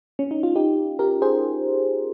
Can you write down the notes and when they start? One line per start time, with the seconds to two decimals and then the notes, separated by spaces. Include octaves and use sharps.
0.19 C#4
0.31 D#4
0.43 F4
0.56 D#4 G4
0.99 G4 A#4
1.22 G#4 C5